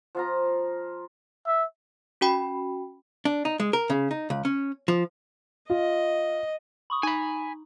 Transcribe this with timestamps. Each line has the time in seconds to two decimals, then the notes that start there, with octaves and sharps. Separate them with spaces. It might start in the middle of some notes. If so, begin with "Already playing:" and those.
0.15 F3 F4 A#5
1.47 E5
2.21 C#4 F#4 G5 B5
3.25 D4
3.45 D#4
3.60 G#3
3.73 A#4
3.90 C#3
4.11 D#4
4.30 C#2
4.45 C#4
4.88 F3
5.70 F4 D#5
6.90 B5 C#6 D#6
7.03 D#4 G#5 B5